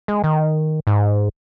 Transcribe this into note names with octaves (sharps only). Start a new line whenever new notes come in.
G#3
D#3
G#2